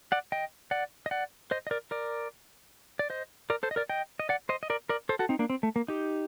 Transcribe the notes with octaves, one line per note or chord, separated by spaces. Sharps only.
D5 F#5
D#5 G5
D5 F#5
D#5
D5 F#5
C5 D#5
D#5
A#4 D5
A#4 D5
D5
C5 D#5
A#4 D5
A4 C5
D#5
A#4 D5
D#5 G5
D#5
D5 F#5
C5 D#5
D#5
A#4 D5
A#4 D5
A4 C5
F#4 A4
C4 D#4
A#3 D4
C4
A3
A#3
D#4 G4